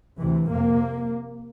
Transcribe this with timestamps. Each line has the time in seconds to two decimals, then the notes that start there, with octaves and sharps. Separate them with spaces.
0.20 D2 C3 E3
0.49 F2 C3 A#3